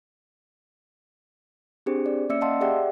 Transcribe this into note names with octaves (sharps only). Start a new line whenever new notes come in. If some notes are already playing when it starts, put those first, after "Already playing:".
C4 D4 G4 G#4 C5
D5
A#3 C#4 D5 E5 E6 C#7
D#5 F5 F#5 A5 C6 E6
G4 G#4 D5 E5 F#5 G5